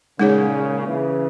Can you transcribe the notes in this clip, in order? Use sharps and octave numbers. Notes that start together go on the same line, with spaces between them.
A#2 C#3 G#3 D#4 G#4 C#5
C#3 E3